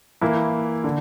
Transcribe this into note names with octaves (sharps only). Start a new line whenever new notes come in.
E3 A#3 E4
D3